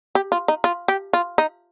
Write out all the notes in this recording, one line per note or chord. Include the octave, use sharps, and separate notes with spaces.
G4
F4
D#4
F4
G4
F4
D#4